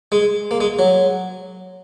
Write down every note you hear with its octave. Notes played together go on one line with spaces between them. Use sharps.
G#3
A#3
G#3
F#3